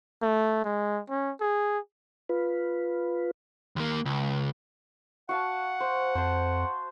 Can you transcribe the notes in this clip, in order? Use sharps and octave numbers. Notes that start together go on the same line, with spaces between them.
A3
G#3
C#4
G#4
F4 B4
D#2 A#3
C#2
F#4 F5 F#5 A5
C5
F2 C5 A5 C6